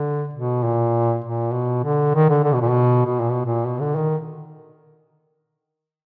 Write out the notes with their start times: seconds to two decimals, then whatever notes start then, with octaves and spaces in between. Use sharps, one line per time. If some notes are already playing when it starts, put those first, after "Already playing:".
Already playing: D3
0.33 B2
0.64 A#2
1.25 A#2
1.54 B2
1.84 D3
2.15 D#3
2.29 D3
2.44 D3
2.54 B2
2.61 A#2
2.70 B2
3.05 B2
3.20 A#2
3.32 B2
3.45 A#2
3.66 B2
3.80 D3
3.96 D#3